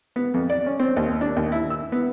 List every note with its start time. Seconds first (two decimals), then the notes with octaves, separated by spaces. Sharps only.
0.16 B3
0.34 F2
0.50 D5
0.66 C#4
0.80 C4
0.96 D#2
1.21 D4
1.36 D#2
1.52 E4
1.70 E6
1.92 B3